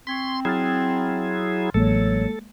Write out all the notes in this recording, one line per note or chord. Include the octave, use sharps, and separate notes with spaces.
C4 C6 C#6 G#6 B6
F#3 E4 G#4 C6 F6 A6
A1 F#3 G#3 A#3 A4